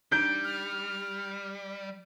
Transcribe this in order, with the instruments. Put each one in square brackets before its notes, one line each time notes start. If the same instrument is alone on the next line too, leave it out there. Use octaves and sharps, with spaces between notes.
[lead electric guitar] G3 [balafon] D4 D#4 [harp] G6 [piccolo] D7
[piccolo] F6